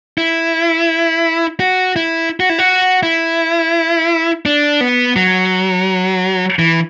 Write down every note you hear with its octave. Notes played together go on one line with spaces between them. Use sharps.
E4
F#4
E4
F#4
E4
F#4
E4
D4
B3
F#3
E3